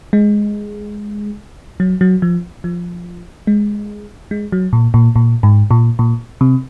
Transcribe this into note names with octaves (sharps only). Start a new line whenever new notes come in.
G#3
F#3
F#3
F3
F3
G#3
G#3
F#3
A#2
A#2
A#2
G#2
A#2
A#2
C3